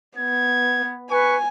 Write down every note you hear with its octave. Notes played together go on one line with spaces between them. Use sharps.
B3 G#6
B4 G#5 C#6